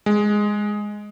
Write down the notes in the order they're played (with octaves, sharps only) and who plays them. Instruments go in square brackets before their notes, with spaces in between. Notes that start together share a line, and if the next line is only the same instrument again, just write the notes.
[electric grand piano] G#3